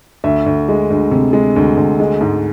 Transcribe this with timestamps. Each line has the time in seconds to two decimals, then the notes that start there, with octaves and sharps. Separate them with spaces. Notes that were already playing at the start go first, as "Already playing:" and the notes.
0.24 D2 E5
0.46 D2
0.69 G#3
0.90 D2
1.11 C3
1.33 G#3
1.56 D2
1.77 D2
2.00 G#3
2.21 G#2